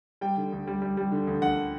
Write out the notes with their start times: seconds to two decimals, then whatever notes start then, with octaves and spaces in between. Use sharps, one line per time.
0.21 G3 G5
0.37 D3
0.52 D2
0.67 G3
0.82 G3
0.97 G3
1.12 D3
1.27 D2
1.42 D2 F#5